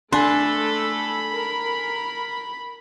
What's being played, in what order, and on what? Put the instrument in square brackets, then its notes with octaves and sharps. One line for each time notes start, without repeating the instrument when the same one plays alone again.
[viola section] A3 A4 [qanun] D4 [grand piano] G#5 C6 [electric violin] B5
[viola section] A#4